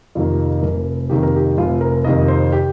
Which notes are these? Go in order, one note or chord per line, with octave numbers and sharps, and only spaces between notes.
F2 C3 D#3 A#3 F4
F1 A#4
F2 C3 D#3 A#3 G4
A#4
G4
F1 F4
A#4
F2 C3 D#3 A#3 D#5
C5
G4